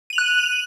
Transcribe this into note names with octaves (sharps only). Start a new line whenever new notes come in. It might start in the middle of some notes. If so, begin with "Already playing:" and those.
F#6 D#7 F7 F#7